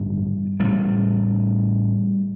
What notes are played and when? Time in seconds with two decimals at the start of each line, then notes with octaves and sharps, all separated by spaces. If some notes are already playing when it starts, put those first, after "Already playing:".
Already playing: A1 G2 D3 G3
0.60 A1 A2 G3